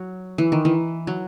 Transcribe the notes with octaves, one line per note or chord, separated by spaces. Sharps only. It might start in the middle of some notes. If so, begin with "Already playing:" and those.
Already playing: F#3
E3
D#3
E3
F#3